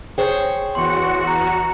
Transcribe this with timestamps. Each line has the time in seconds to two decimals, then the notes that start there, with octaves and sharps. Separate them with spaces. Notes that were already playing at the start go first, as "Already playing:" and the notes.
0.18 G#4 C5 C#5 G5
0.75 E2 F#4 C6 C#7
1.27 A#5